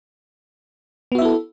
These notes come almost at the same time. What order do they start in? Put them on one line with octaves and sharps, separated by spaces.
B3 F#4 E5 E4 A4